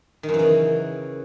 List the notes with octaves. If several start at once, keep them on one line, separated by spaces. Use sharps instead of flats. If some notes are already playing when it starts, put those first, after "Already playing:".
D#3
F#2
E3
C#3